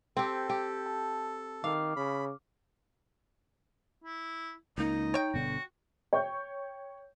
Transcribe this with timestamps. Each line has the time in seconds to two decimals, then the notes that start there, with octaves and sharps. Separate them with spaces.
0.17 C4 G4 A4
0.50 G4
0.86 A5
1.64 D#3 F5 D6
1.96 C#3 B5
4.04 E4
4.78 C#2 A#3 D#4 D#5
5.14 C#5 G5
5.34 G1 B2 D3 F#4
6.13 C#5 G5 C#6 G6